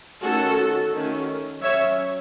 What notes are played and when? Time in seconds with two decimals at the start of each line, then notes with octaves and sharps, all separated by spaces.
0.21 D#3 A3 C#4 F#4 A4
0.92 D#3 A3 C#4
1.62 F#3 C#4 C#5 E5